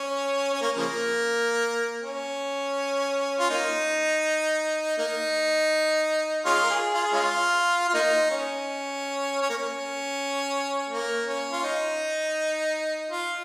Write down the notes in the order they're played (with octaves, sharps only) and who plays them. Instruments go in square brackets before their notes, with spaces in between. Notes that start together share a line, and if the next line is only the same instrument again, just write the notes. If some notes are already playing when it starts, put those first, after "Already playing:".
Already playing: [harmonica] C#4
C#4
A#3
C#3 F3 A#3
C#4
F4
A#3 D#4
A#3 D#4
G#3 C#4 F4
A#4
G#4
F4
G#4
G#3 C#4 F4
F4
A#3 D#4
C#4
C#4
A#3
C#4
A#3
C#4
F4
D#4
F4